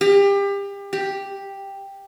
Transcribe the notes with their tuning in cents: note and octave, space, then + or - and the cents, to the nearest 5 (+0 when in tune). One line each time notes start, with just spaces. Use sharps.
G4 +30
G4 +5